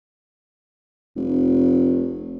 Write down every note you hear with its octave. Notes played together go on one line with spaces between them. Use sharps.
F1